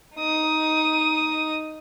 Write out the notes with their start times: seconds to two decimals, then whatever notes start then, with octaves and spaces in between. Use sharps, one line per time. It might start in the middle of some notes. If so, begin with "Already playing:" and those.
0.16 D#4 D#6